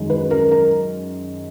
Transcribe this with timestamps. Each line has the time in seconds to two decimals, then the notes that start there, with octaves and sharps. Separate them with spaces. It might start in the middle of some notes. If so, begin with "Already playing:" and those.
Already playing: F#2 D#3 G#3
0.10 B4
0.31 A#4
0.51 A#4